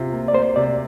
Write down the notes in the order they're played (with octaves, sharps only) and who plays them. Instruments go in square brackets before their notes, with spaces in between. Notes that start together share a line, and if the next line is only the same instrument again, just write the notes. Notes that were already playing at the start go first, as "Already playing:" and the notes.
Already playing: [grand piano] C3 F4
A#3
[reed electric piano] D5
[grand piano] A#3 [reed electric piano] C5
[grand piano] C3 [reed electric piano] D5